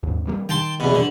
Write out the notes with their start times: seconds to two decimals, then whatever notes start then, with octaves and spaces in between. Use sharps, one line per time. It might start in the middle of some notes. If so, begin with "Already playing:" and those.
0.03 D#2 G#2
0.27 E3 G3 A#3
0.49 D#3 G5 A5 C6
0.80 E2 B2
0.94 D3 E3